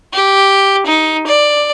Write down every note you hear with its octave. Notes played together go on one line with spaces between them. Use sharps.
G4
D#4
D5